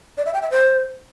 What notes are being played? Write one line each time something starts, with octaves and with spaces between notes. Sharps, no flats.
D5
E5
G5
E5
C5